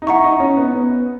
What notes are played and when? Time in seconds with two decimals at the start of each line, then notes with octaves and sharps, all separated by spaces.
0.02 D#4
0.07 E4 F#5 A#5 C#6
0.24 D#4
0.40 C#4
0.57 B3
0.74 B3